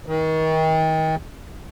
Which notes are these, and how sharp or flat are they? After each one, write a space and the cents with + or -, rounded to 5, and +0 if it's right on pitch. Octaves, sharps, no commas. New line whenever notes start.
D#3 +35